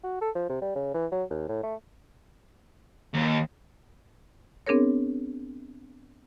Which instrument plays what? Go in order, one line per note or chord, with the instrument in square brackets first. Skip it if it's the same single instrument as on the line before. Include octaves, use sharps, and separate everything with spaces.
[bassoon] F#4
A4
F3
C3
G3
C#3
E3
F#3
D#2
A2
A3
[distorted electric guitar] D#2
[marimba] B3 C4 D4 G#4 A#4 C#5